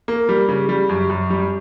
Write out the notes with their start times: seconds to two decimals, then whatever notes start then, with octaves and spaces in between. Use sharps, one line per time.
0.08 A#3
0.29 G3
0.49 C#3
0.69 G3
0.89 F#2
1.10 F#2
1.30 G3